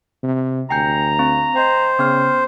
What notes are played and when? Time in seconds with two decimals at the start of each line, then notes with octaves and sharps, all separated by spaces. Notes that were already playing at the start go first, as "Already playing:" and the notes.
0.23 C3
0.70 D2 G5 G#5 A#5 G6
1.19 C4
1.56 C5 D#5 G5
1.99 C#3 B3 G5 F6